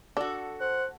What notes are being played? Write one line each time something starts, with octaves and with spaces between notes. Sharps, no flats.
D4 F#4 A4
C5 F#5